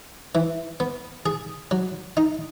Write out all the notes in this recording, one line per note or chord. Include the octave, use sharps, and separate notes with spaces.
E3
B3
G#4
F#3
D#4